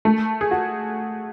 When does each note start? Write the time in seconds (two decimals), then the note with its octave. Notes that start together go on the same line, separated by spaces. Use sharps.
0.05 A3
0.41 G#4
0.51 F#4